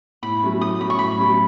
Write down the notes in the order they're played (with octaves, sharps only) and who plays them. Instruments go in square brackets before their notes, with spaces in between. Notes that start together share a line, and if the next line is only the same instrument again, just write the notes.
[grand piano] A2 [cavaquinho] B5
[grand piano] F#3 A3 C#4
[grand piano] A2 [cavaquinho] D#6
[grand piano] F#3 A3 C#4 [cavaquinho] B5
[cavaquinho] C#6
[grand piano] A2 [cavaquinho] B5
[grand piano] F#3 A3 C#4